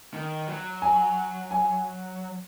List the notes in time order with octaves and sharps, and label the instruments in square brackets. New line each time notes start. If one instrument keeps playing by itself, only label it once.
[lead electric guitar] D#3
F#3
[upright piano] G#5
G#5